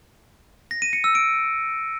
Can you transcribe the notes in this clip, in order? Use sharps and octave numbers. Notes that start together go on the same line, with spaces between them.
A#6
D#7
C#7
E6
D7